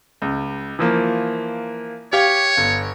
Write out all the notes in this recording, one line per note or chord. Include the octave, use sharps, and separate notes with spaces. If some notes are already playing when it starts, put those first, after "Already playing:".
C#2
E3 F3 A#3
G4 C#5 F5
G1